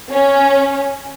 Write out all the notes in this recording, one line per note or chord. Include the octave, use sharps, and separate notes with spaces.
C#4